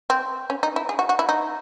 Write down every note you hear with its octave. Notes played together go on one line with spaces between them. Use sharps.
C4
C#4
D#4
E4
G#4
F#4
F#4
E4
D#4